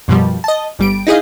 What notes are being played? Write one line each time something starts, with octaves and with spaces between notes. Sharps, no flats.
F#2 B2 F3 G3
D#5 A5
G1 G3 D7
D#4 E4 G#4 D#5 F5